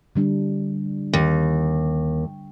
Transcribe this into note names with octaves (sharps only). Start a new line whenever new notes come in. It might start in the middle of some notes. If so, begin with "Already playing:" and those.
D3 G3 D4
D#2